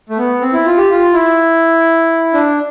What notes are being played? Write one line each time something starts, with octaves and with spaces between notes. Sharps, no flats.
A3
B3
C4
E4
F4
G4
F4
E4
D4